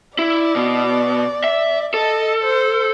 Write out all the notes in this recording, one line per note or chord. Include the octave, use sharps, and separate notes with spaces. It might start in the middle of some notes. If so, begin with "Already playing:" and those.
E4 D5
B2
E5
A4 D#5
C5